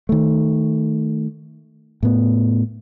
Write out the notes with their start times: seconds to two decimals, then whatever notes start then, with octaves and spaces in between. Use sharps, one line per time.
0.09 D#3 A3
2.03 A2 B3